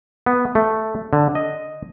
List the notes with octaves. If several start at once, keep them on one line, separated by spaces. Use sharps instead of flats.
B3
A3
D3
D#5